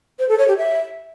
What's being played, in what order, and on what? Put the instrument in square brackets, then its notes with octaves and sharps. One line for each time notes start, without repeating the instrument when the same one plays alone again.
[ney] C5
A4
C#5
G4
E5